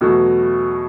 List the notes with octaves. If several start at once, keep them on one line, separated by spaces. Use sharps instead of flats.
E2 B2 F#3 A3